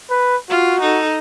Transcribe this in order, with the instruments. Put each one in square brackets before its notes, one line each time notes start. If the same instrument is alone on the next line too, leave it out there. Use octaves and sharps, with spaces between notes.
[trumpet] B4
[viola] F4 [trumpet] F#4
[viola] D#4 A4